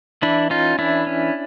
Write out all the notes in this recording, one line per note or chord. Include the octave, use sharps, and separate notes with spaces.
E3 D4 E4
C#4 D#4 F4
E3 D4 E4
C#4